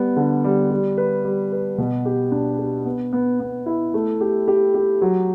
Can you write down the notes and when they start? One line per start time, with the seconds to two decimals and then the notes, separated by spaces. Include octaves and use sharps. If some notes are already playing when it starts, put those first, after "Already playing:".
Already playing: G3 B3
0.16 D3
0.44 G3
0.71 G3
0.97 B4
1.25 G3
1.52 B4
1.78 B2
2.05 G4
2.32 D4
2.59 G4
2.86 B3
3.13 B3
3.40 B3
3.66 E4
3.94 A3
4.21 G4
4.48 G4
4.74 G4
5.02 F#3